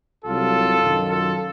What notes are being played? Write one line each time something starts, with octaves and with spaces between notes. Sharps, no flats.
C2 C3 F#3 F4 A4
F#2 D#3 F#3
F4 A4